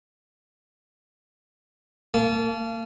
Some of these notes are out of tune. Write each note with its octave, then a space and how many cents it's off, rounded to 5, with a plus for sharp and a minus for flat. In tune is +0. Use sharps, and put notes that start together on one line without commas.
A#3 -35 A5 -20